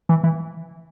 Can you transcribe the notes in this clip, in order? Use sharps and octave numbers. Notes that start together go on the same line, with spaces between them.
E3
E3